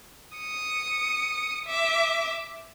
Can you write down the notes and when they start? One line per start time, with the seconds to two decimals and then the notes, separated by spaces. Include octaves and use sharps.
0.37 D#6 C#7
1.65 E5 D6